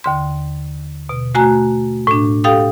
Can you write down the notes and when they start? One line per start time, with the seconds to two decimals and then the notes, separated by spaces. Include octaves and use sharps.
0.04 D#2 D3 C6
1.09 B2
1.35 A3 F#4 G#5 A#5 F#6
2.07 A2 D4
2.44 G4 A4 F5 G5 D#6